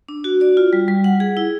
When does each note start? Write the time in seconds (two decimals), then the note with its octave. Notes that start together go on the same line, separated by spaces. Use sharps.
0.09 D4
0.24 F#4
0.41 D5
0.57 F4
0.73 G3
0.88 G3
1.04 F#5
1.20 G#4
1.37 E4